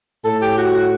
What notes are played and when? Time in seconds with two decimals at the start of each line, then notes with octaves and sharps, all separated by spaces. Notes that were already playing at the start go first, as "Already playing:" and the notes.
0.24 A2 A4
0.42 G4
0.58 F#4
0.74 F#4